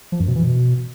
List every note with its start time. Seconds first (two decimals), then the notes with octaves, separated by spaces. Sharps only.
0.12 F3
0.20 F#2
0.28 B2
0.35 E3
0.43 B2